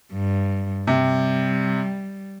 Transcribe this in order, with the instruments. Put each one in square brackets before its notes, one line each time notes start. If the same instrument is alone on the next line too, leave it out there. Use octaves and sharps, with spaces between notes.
[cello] G2
[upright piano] C3 [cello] G3